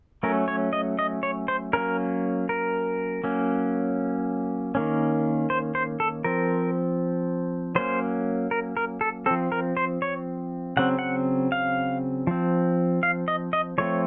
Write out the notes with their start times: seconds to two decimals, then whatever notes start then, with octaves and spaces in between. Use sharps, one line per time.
0.23 F#3 A3 C#4 A#4
0.48 C#5
0.73 D#5
0.99 D#5
1.23 C#5
1.48 C5
1.73 F#3 A#3 C#4 A#4
2.49 A#4
3.24 F#3 A#3 C#4
4.75 D#3 A#3 C#4
5.50 C5
5.75 C5
6.00 A4
6.24 F3 C4 A#4
7.75 F#3 A#3 C#4 C5
8.51 A#4
8.77 A#4
9.01 A4
9.26 F3 C4 A4
9.52 A#4
9.77 C5
10.02 C#5
10.77 C#3 F#3 C4 F#5
10.99 F#5
11.52 F5
12.27 F3 C4
13.03 F5
13.28 D#5
13.53 D#5
13.78 F3 A3 C4 C#5